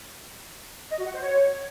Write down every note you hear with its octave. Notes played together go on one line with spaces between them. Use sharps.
D#5
F#4
F#5
C5
C#5